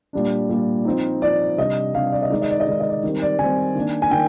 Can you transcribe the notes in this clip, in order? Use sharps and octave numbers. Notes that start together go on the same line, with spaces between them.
A#2 G3 D4
A#2 G3 D4
F3 C4 D#4
F3 C4 D#4 D5
C3 G3 D4 D#5
C3 G3 D4 F5
D5
D#5
D#3 G#3 D#4 D5
D#5
D5
D#5
D#3 G#3 D#4 D5
D#5
D5
D#3 G3 C4
D5
D#3 G3 C4 G#5
D#3 A#3 D4
G#5
D#3 G5